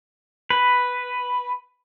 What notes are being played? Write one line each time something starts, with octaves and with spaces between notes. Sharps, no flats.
B4